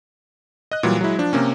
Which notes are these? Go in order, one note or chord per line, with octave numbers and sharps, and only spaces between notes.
D#5 F#6
A#2 E3 F#3 G3
F#3 G#3 E4
F3 D4
C3 A#3 C#4